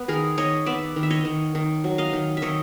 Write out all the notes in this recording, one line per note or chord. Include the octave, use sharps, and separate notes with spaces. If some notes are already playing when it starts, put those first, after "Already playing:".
Already playing: B3
D#3 G#4 A#4
D#3 C#5 D#5
B3 D5 E5
D#3
E5
C#5 D#5
D#3
D#3
F#3
D#5 F5
D#3
E5
D#3 C#5 D#5